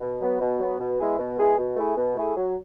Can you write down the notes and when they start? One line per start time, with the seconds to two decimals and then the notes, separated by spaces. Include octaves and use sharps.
0.01 B2
0.20 F#3 B3
0.41 B2
0.59 F#3 B3
0.79 B2
0.99 G#3 B3 E4 G#4
1.18 B2
1.38 G#3 B3 E4 G#4
1.58 B2
1.77 A3 E4 G#4
1.97 B2
2.16 A3 E4 G#4
2.36 F#3